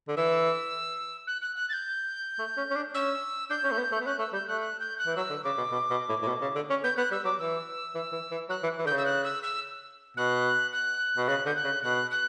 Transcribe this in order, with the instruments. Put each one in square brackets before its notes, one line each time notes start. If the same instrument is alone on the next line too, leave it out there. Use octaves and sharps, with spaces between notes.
[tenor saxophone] D3
[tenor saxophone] E3 [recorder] E6
[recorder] F#6
F#6
F#6
A6
G6
[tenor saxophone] A3
C#4
C#4
D4
[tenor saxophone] C#4 [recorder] E6
[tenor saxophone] D4 [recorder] G6
[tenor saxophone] C#4
A3
B3
A3
B3
[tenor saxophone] C#4 [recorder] F#6
[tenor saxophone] A3 [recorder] E6
[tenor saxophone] G3 [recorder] G6
[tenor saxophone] A3 [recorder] F#6
[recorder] F#6
G6
F#6
[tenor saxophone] E3
[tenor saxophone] F#3 [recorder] E6
[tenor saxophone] D3
[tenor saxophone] C#3 [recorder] D6
[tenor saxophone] B2
B2
B2
A2
A2
B2
C#3
D3
C#4
[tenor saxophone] B3 [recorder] G6
[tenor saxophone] B3 [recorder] F#6
[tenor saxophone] G3 [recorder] E6
[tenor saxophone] F#3 [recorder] D6
[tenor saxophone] E3 [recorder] E6
[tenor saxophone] E3
E3
E3
[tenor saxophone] F#3 [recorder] F#6
[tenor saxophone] E3
E3
[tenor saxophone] D3 [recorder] G6
[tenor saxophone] C#3
[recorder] E6
F#6
E6
E6
[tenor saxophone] B2 [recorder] F#6
[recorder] F#6
[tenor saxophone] B2
[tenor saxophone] C#3 [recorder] F#6
[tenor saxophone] D3 [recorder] G6
[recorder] F#6
[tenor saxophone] C#3
[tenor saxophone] B2 [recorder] F#6
[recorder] F#6